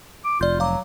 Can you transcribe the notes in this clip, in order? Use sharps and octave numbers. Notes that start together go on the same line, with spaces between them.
D6
F1 F4 D5 G6
F#3 F5 D6